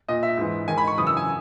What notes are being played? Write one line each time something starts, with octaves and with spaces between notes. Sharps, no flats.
A#2 D#5
E5
G#2 E3
G#2 D#3 G#5
B5
C#6
F#2 C#3 E3 D#6
E6
G#5